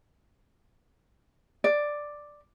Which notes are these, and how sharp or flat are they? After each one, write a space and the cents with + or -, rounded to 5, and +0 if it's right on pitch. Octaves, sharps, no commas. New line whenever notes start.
D5 +5